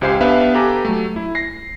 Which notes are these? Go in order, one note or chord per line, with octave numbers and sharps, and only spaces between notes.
C#2 G4 C5 F5 G#5 C7
B3 D4 G4 B4 E5 F5
G4 A4 B4 G#5 A#5 D6
F#3 A3
E4
A#6 C7